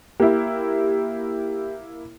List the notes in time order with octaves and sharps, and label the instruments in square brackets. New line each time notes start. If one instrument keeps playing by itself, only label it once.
[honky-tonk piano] A#3 E4 [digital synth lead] G4